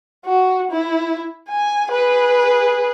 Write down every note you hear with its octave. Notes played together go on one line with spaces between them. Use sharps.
F#4
E4
G#5
G#4 B4